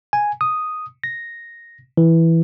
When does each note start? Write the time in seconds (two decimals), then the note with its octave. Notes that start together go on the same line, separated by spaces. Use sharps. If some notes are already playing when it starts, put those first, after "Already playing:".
0.13 G#5
0.41 D#6
1.04 A#6
1.97 E3